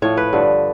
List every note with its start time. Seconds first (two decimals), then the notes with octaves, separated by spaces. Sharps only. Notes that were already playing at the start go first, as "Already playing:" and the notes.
0.02 A2 F3 C#5
0.17 B4
0.33 G2 D3 F3